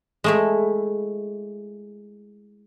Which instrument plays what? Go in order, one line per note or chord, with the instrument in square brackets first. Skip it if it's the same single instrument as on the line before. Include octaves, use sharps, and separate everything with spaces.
[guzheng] G#3 A3 E4